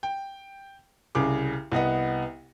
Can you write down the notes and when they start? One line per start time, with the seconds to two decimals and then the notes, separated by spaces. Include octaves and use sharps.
0.03 G5
1.15 C2 C#3 G#4 D6
1.72 C2 B3 D#5 F#5